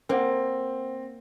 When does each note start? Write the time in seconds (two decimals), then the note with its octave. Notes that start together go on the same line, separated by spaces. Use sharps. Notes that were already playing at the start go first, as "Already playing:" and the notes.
0.09 A#3 C4 C5 F#5